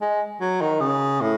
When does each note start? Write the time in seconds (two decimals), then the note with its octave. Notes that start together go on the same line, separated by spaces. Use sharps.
0.01 G#3
0.41 F#3
0.61 D#3
0.80 C#3
1.21 A2